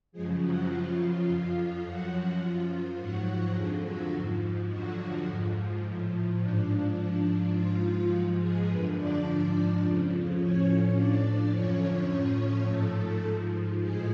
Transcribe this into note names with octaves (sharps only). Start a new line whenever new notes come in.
F#2 C#3 F3 G#3 G#4
F#3 F#4
F#2 C#3 F3 F4
F2 F3 F4
F#2 F3 F#3 F#4
F#2 F3 F4
G#2 F3 F#3 F#4
F2 D3 F3 G#3 G#4
F#3 F#4
G#2 F3
F2 D3 F3 F#3 F#4
G#2 F3
A2 F3
G#2 F3 D4
G#2 F3 D4
G#2 F3 F4
G#2 F3 F#3 F#4
G#3 G#4
F#2 D3 F3 B3 B4
D4 D5
G#2 F3
F2 C#3 F3
A2 F3 C#4 C#5
A2 F3 D4 D5
F#2 D3 F3 C#4 C#5
A2 F3 C#4 C#5
G#2 F3 A3 A4
G#2 F3
A2 F3 G#3 G#4